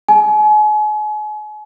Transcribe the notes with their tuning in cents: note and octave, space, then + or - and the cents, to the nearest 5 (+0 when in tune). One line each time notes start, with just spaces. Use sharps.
G#5 +40